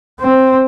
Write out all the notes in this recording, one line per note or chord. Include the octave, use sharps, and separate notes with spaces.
C4